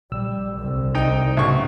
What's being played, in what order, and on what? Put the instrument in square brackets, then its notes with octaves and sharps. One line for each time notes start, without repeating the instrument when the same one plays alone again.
[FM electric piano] A#1 E6 [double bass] G3
[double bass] C2 D3
[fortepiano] D#4 G5
[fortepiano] B1 C#6 [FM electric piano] A2 C#3